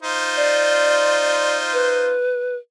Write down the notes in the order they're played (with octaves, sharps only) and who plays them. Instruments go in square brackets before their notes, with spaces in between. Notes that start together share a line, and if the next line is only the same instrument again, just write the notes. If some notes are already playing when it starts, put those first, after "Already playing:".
[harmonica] D#4 F4 C5
[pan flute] D5
B4